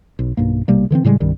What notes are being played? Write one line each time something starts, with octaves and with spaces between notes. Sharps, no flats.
B1
B1 G2 A#3
B1 C3 G3 A#3
D3 E3 A#3 C4
A2 C#3 G3 G#3
C2 G2 D#3 G3